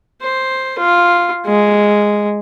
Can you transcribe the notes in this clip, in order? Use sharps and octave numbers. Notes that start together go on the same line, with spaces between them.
C5
F4
G#3